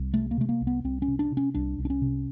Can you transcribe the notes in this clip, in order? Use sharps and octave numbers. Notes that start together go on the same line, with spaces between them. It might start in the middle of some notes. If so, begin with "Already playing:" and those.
Already playing: C2
C3 A3
A#3
C3 A3
A#3
C2
B3
C2 C4
C#4
C3
D4
C3
C#4
C2 D4
C2
D4
C#4
C3